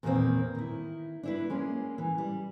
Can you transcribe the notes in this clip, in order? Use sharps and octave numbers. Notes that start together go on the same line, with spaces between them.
E2 A#2 D#3 G3 A#3 C4
D#3 E4
D4 E4 B4
G#3 A#3 C#4
E3
G3